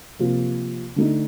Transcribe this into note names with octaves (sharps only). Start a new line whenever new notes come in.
C3 F3 A#3 F4
D3 A3 D#4